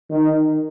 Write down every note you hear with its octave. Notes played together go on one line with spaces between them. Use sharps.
D#3